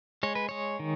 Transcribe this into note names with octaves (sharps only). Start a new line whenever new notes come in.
G#3 C#5
B4
G#3 C#5
D#3